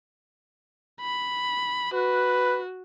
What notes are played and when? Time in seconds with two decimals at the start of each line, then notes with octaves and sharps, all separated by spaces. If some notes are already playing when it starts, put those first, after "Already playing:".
1.01 B5
1.94 F#4 B4